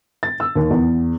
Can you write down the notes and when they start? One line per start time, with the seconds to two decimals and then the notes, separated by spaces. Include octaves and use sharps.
0.23 A6
0.40 E6
0.55 D#2
0.71 E2